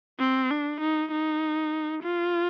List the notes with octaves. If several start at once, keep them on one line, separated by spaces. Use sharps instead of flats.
C4
D4
D#4
D#4
F4